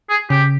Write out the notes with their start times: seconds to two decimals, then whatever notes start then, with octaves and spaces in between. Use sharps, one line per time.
0.09 G#4
0.30 C#3 G4